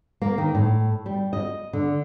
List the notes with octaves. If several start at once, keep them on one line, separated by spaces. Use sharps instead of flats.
A#3
D#3
A2
G3
D#5
D3